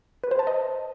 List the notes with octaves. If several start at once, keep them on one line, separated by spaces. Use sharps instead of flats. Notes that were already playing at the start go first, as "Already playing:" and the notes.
B4
C5
A5
D#5